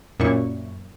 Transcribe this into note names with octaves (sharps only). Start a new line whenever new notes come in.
F#2 A#2 E4 C#6